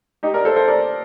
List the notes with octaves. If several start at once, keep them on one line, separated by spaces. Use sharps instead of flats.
D#4 G4
A#4 D5
A4 C5
A4 C5
A#4 D5